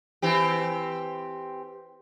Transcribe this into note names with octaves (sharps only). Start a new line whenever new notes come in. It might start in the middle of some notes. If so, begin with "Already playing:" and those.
E3 C4 G4